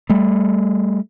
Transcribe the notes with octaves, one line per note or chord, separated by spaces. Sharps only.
G3 A3